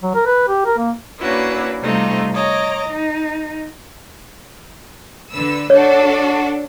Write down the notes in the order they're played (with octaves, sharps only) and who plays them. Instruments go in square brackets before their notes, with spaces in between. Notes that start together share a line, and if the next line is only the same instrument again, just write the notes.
[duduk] F#3
A#4
B4
G4
A#4
A#3
[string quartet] A#3 C#4 D4 E4 F#4 B4
C3 G3 A3 D#4 F4
C#5 D#5 A#5 D6
D#4
[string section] D3 B4 E6
[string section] D4 F#4 A4 [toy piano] C#5